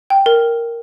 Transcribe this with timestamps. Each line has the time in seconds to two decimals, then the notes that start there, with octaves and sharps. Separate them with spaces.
0.10 G5
0.26 A#4